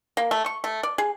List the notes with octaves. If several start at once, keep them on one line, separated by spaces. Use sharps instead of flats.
A#3
A3
C#6
A3
D5
G#4